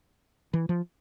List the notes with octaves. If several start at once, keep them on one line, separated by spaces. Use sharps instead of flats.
E3
F3